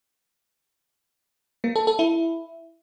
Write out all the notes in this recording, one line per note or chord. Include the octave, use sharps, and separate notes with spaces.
A#3
A4
A4
E4